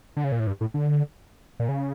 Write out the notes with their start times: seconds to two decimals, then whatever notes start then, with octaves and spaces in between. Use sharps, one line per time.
0.17 D3
0.24 C#3
0.32 A#2
0.40 A2
0.47 G2
0.61 A2
0.74 D3
1.60 A#2
1.69 C#3